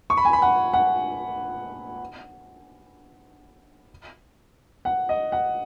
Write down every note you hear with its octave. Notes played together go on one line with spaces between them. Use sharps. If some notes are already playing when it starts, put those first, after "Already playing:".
C#6
B5
G#5
B5
F#5
F#5
F#5
D#5
F#5